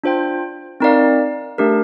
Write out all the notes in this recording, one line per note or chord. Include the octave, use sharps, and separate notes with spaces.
D4 F4 C5 G5
C4 D#4 A#4 D5 F5
A3 D4 G4 A#4